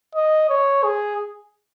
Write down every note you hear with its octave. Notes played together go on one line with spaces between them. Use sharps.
D#5
C#5
G#4